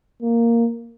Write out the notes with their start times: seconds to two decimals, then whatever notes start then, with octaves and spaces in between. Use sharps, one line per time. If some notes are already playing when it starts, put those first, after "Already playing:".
0.22 A#3